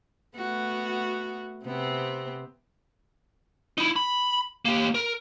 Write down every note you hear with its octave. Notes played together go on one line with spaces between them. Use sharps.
A3 B3 F#4
C3 B3 C4
D#4 E4
B5
A#3 G4
A#4